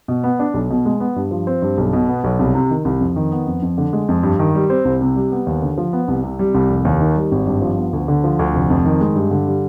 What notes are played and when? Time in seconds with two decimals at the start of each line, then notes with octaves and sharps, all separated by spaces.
0.08 B2
0.24 B3
0.39 D4
0.54 B1
0.70 B2
0.86 G#3
1.00 B3
1.16 G2
1.31 F3
1.47 C4
1.62 G2
1.78 B1
1.93 B2
2.09 B3
2.24 B1
2.39 C2
2.54 C3
2.70 D#3
2.85 C2
3.01 F2
3.16 D#3
3.32 B3
3.47 F2
3.62 F2
3.78 D3
3.93 G#3
4.08 F2
4.23 G2
4.39 D#3
4.55 G3
4.70 C4
4.85 C2
5.01 C3
5.16 G3
5.31 B3
5.47 D#2
5.62 D3
5.78 F3
5.93 B3
6.08 C2
6.24 C3
6.39 G3
6.55 C2
6.70 F1
6.85 D#2
7.01 D#3
7.16 G3
7.32 G#1
7.47 G2
7.62 F3
7.78 B3
7.93 D2
8.08 D3
8.24 F3
8.39 D2
8.54 F1
8.70 F2
8.85 D#3
9.01 G#3
9.16 G2
9.31 D3
9.47 G3